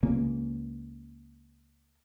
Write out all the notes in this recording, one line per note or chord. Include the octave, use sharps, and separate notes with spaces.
C#2 C#3 A#3